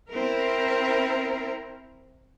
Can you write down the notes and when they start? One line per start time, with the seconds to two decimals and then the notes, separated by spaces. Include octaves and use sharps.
0.10 C4 E4 A#4